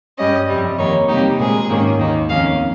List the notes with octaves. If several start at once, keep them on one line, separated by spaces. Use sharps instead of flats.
G2 G3 C#4 D#5
F2 C3 G3
F2 D#3 A#3 D#4 C#5
C3 G3 A#3 D#4 G4
A#2 G#3 C4 G#4
G#2 D#3 A#3 C#4
D#2 D#3 A#3 D#4
F2 D#3 A#3 C#4 F5